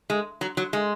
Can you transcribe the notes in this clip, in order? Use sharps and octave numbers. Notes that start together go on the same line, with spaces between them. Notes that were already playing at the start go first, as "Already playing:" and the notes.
G#3
F#3
F#3
G#3